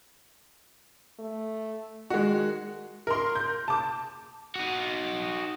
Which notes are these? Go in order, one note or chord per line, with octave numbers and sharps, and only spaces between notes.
A3
D#3 G#3 F#4
A#4 C6
G6
A5 D6
D#4 F#4